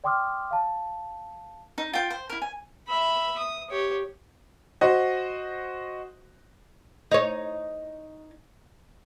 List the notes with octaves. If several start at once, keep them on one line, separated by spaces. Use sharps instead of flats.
D5 G5 C6 D6 D#6 F6
F5 A5
D#4
F4 G5
C5
E4 A#4
G#5
E5 B5
D#6
G4 C#5
F#4 C5 D#5
D#4 C#5